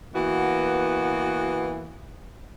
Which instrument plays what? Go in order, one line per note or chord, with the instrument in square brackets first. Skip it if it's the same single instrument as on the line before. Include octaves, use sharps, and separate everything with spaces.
[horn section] E3 A#3 B3 F#4